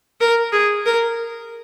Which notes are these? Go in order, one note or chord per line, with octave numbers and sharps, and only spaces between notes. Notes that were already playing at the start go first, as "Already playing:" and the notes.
A#4
G#4
A#4